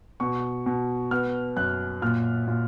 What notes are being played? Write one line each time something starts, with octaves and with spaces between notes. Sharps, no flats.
B2 C#6
B2
B3 F6
F#2 F#6
A#2 F6
A#2